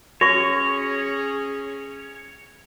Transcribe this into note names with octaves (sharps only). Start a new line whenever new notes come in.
C#4 F#4 G#4 C#5 C#6 A#6